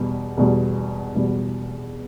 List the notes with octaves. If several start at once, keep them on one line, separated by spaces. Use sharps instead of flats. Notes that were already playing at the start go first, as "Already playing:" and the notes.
Already playing: E2 B2 G3
E2 B2 G3
E2 B2 G3